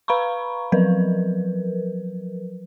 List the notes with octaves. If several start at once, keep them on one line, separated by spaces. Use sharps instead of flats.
B4 F5 A#5 B5 C#6
F3 F#3 A#4 B4